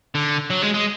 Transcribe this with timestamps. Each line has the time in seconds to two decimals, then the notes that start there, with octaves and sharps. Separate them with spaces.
0.15 D3
0.50 F#3
0.62 G#3
0.74 G#3